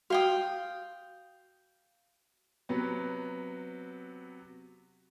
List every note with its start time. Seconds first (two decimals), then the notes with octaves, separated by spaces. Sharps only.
0.10 F#4 F5 G5 D#6
2.69 C3 F#3 B3